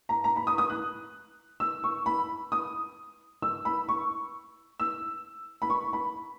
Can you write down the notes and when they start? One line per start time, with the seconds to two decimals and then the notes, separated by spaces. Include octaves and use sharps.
0.09 A#5
0.24 A#5
0.36 B5
0.47 D#6
0.58 D#6
0.70 F#6
1.60 E6
1.84 C#6
2.06 B5
2.52 D#6
3.42 E6
3.65 B5
3.89 C#6
4.80 E6
5.62 B5
5.70 C#6
5.93 B5